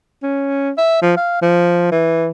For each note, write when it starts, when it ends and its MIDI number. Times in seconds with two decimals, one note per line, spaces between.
0.23 0.71 61
0.78 1.00 76
1.02 1.12 53
1.17 1.38 77
1.42 1.89 53
1.92 2.31 52